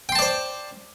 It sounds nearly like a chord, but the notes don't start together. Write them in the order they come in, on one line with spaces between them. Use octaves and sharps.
G5 C6 A5 D5 C5